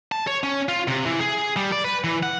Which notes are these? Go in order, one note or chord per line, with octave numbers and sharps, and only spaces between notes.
A5
C#5
C#4
F4
C3
E3
G#4
G3
D5
B4
E3
F#5